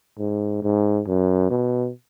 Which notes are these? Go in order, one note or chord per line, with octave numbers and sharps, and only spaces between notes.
G#2
G#2
F#2
B2